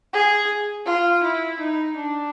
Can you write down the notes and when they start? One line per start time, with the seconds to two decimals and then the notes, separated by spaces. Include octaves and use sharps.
0.13 G#4
0.86 F4
1.23 E4
1.59 D#4
1.96 D4